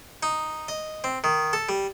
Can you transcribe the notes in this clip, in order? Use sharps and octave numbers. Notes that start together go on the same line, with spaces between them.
D#4
D#5
C4
D#3
A4
G3